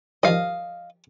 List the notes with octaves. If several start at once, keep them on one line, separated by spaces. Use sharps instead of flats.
D#3 F3 G3 D#5 F5